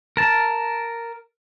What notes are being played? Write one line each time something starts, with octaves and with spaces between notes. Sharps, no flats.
A#4 A5